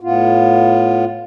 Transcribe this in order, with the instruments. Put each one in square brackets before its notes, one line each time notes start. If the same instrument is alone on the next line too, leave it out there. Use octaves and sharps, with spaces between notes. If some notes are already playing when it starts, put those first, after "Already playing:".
[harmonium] A2 B3 F4